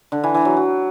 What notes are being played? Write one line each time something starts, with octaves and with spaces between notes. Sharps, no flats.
D3
E3
E3
F#3
F#3